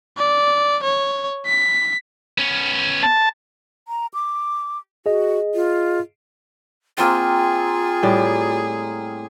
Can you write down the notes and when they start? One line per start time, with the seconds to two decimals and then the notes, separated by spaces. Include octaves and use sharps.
0.18 D5
0.84 C#5
1.46 B6
2.38 B3 C#4
3.03 A5
3.88 A#5
4.14 D6
5.06 F#4 G#4 D#5
5.54 F4
6.98 A#3 C4 F4 G#4 G5
8.03 A2 G3